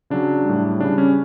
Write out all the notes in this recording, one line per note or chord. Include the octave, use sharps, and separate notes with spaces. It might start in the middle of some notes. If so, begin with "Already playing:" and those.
C#3 F#3 D4
A2 G3
C#3 G3 D4
C#4